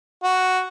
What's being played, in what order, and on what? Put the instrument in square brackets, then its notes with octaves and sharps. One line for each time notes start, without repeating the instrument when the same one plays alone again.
[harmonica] F#4